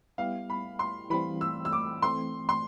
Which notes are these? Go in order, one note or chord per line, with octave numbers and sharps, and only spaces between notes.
G3 B3 E4 G4 F5
B5
C6
E3 G3 C4 B5
E6
E6
D6
E3 A3 C4 C6
C6